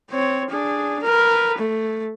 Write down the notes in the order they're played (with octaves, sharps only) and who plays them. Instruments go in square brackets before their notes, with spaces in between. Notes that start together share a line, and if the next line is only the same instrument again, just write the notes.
[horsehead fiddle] C4 C#5
D4 G#4
A#4 B4
A3